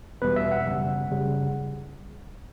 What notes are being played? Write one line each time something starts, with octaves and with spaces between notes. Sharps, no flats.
E2 B2 G3 B4
E5
F#5
F#2 C#3 G3
F#2 C#3 G3